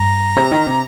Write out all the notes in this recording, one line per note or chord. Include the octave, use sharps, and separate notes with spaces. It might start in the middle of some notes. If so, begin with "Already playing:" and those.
Already playing: G2 A#5
C3
D#3
C3